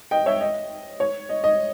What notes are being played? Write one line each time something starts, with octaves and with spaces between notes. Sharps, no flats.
D#5 G5
C#5 E5
D#5
C#5
D#5
D#5